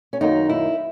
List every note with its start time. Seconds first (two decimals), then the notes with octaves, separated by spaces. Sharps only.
0.13 C#4
0.21 F#2 D#3 A#3 D#4
0.49 E4